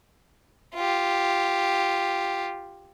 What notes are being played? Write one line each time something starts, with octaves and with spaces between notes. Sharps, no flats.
F4 G4